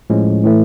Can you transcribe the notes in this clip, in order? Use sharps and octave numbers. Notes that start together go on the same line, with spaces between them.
A2 F3 G#3 C#4
A2 E3 A3